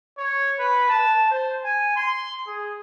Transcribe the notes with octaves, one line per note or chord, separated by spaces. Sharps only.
C#5
B4
A5
C5
G#5
C6
G#4